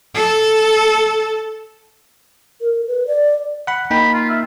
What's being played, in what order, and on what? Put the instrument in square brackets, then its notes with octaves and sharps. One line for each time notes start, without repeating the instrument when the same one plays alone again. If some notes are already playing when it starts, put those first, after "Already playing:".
[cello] A4
[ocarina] A#4
B4
D5
[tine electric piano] F#5 B5
[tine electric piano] A#3 D#4 G5 [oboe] B5
[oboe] F4
E5